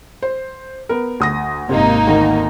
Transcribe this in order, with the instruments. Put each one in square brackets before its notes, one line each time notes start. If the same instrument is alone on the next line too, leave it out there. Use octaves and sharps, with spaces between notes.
[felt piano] C5
B3 A#4
D2 D#6 A#6
[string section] G#1 A#3 D#4 [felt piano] C3
[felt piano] D2 D#3